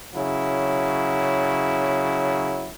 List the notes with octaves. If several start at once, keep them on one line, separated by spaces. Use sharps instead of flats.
C#3 F#3 E4